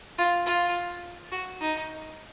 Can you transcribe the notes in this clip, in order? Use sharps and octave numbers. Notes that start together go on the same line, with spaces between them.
F4
F4
F#4
D#4